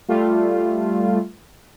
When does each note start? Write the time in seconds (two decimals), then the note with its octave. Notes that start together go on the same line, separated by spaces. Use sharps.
0.09 G3 A3 F4